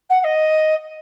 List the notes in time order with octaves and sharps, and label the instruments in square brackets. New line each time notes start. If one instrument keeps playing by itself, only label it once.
[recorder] F#5
F#5
D#5